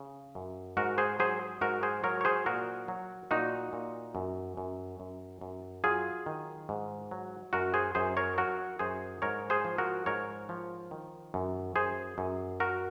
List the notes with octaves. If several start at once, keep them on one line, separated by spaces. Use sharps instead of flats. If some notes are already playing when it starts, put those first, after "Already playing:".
Already playing: C#3
F#2
G#2 F#4 A#4
G#4 C5
F#3 G#4 C5
G#2 F#4 A#4
G#4 C5
F#3 A#4 C#5
C#5
G#4 C5
A#2 F#4 A#4
F#3
A#2 D#4 F#4
A#2
F#2
F#2
F#2
F#2
F#3 F4 G#4
D#3
G#2
F#3
F#2 F#4 A#4
G#4 C5
F#2 G#4 C5
A#4 C#5
F#3 F#4 A#4
F#2 G#4 C5
G#2 A#4 C#5
G#4 C5
F3
F#4 A#4
G#2 A#4 C#5
F3
D#3
F#2
F#2 G#4 C5
F#2
F#3 F#4 A#4